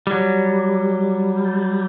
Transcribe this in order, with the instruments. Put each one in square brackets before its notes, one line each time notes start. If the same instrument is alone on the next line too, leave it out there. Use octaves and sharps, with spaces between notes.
[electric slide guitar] F#3 G3